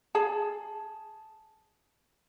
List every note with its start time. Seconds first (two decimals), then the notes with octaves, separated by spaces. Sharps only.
0.15 G#4 A5